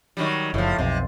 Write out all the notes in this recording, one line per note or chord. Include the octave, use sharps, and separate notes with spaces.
D#3 F#3 G3
F#1 A2 F3
B1 F2 C3